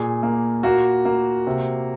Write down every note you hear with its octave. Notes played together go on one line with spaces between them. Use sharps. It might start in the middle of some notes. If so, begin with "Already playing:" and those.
Already playing: A#2 G#4
A#3
A#3 F#4
A#3
C3